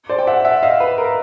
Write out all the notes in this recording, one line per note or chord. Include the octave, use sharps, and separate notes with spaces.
C5 D5
G5
E5 F#5
E5 F#5
D#5 F5
B4
A#4